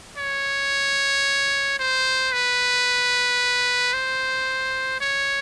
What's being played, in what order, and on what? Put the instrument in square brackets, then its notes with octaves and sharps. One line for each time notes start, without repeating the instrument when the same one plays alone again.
[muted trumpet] C#5
C5
B4
C5
C#5